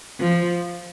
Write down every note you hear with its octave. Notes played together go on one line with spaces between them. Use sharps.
F3